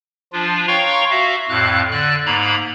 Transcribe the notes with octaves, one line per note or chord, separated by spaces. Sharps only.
F3 D4 F4
C#5 F5 G5 A#5 C6 C#6
F#4 E5 F5
F2 A2 F5 F#6
D3 D5 F#6
G#2 A#3 A#5 B5